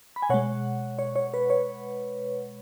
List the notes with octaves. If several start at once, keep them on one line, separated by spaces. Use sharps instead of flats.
B5
G#5
B2 G#3 C#5 F#5
C#5
C#5
B4
C#5